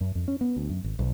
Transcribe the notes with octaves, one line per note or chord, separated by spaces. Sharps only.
F#2
F2
C#4
B3
D2
F#2
G#1
B1